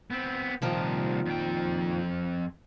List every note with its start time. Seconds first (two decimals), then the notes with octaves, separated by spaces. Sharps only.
0.10 B3 C4
0.62 C2 A#2 D#3 F3 A5
1.26 F2 G5